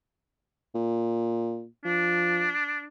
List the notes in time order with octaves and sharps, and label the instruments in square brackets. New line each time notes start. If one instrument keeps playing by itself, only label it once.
[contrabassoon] A#2
[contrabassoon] F3 [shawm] D4